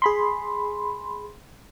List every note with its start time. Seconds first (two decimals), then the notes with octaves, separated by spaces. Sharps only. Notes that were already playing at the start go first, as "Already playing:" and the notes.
0.02 G#4 B5 C6